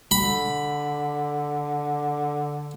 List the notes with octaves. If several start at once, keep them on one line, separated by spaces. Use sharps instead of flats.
D3 B5